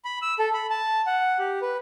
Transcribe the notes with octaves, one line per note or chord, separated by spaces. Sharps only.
B5
E6
A4
B5
A5
F#5
G4
B4